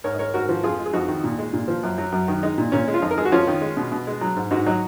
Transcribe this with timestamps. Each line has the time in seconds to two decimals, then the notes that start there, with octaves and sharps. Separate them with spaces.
0.04 G#2 A#4 C#5
0.14 D#5
0.19 G#3 A#4 C#5
0.34 G#2 F#4 A#4
0.49 F3
0.63 F2 F4 G#4
0.79 G#3
0.86 G#4
0.93 F2 D#4 F#4
1.08 D#3
1.24 A#2
1.38 G#3
1.53 A#2
1.68 F3
1.83 F#2
1.98 F#3
2.12 F#2
2.28 D#3
2.43 G#3 D#4
2.58 A#2
2.72 A#2 C#4
2.88 G#3
2.94 F4
3.02 F2 D#4
3.11 A#4
3.17 G#3 G#4
3.25 F#4
3.32 F2 C#4 F4
3.47 D#3
3.62 G#3
3.77 B2
3.92 B2
4.07 G#3
4.21 F#3
4.36 G#2
4.51 G#2 D#4 F#4
4.66 F#3 D#4 F#4